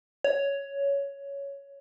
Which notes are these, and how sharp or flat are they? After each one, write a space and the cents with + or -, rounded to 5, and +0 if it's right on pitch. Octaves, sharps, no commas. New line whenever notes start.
C#5 +10